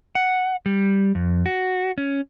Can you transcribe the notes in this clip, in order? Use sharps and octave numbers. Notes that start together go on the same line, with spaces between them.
F#5
G3
F2
F#4
C#4